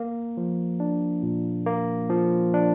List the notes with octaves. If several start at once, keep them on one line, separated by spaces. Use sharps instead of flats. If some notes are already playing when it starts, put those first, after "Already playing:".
Already playing: A#3
F3
D4
A#2
A#3
F3
D4